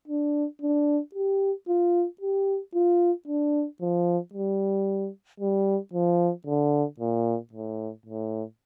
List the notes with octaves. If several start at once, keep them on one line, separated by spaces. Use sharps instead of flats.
D4
D4
G4
F4
G4
F4
D4
F3
G3
G3
F3
D3
A#2
A2
A2